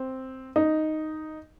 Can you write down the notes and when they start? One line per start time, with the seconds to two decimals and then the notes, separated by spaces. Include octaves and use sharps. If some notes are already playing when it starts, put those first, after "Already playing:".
Already playing: C4
0.56 D#4